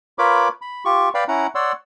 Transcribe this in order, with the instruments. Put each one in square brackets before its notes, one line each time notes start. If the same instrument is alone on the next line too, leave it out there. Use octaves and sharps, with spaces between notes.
[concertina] F4 A#4 B4 C#5 B5 D6
B5
F4 G4 C#6
B4 D5 F5 G5 B5
C#4 E4 F#5 A#5
C#5 D5 F#5 C6 E6